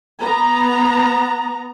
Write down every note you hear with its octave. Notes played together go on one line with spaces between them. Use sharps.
B3 A#5